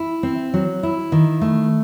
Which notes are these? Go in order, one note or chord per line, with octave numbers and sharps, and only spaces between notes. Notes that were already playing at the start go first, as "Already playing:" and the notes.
Already playing: E4
C4
F#3
E4
D#3
A3